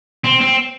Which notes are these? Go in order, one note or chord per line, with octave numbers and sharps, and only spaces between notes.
C4
C4